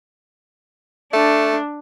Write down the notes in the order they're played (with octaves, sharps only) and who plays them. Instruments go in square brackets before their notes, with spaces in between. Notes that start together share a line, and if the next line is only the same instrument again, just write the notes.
[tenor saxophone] A3 [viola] D4